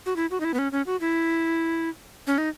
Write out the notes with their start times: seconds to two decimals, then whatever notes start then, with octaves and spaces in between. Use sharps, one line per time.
0.06 F#4
0.16 E4
0.31 F#4
0.40 D#4
0.45 E4
0.54 B3
0.59 C#4
0.72 C#4
0.86 F#4
1.01 E4
2.27 C#4
2.38 D#4